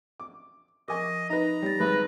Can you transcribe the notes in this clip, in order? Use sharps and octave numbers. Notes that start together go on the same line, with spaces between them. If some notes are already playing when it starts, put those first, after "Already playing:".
D6
F3 A#4 D#5 G#5 C#6 D6
D#4 B4 D#5 A#5
G3 C#5 A6
G#1 B4